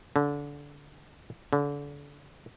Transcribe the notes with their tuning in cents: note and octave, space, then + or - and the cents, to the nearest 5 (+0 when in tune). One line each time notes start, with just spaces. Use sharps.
D3 -25
D3 -35